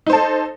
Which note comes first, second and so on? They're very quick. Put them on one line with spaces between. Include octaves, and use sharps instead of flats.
D#4 C5 A4